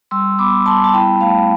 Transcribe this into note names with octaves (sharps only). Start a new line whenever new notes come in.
G3 C6 E6
B3 B5 D6
G3 A5 C6
A5
E4 G5 B5
A3 F5 A5